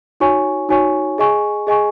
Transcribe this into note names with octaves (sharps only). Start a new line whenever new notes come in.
D#4 F#4 C#5 G#5 C#6
D#4 F#4 C#5 G#5 C#6
G#4 D#5 G#5 C#6
G#4 D#5 G#5 C#6